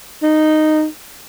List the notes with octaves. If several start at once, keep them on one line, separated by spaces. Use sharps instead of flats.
D#4